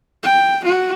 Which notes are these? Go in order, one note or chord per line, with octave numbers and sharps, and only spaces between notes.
G5
F#4